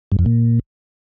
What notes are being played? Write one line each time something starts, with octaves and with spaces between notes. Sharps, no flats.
G2
F2
A#2